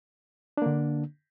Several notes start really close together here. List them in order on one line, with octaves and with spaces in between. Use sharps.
D4 A#3 D3